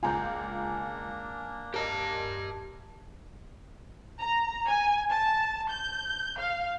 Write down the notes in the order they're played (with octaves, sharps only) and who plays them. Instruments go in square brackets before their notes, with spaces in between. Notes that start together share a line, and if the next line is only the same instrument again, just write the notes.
[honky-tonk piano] C#2 F4 [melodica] A#3 D4 [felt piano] G#5 A#5 G6
[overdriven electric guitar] G4 A5 [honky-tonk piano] A#4 D#5
[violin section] A#5
G#5
A5
G6
F5